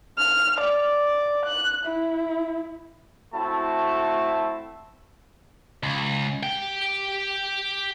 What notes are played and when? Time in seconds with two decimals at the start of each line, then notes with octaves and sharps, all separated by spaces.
0.18 F6
0.60 D5
1.45 F#6
1.86 E4
3.33 A3 C4 E4 F#4 E5 A5
5.83 C#2
6.43 G4 G5